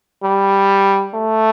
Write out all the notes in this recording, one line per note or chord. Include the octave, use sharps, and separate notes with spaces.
G3
A3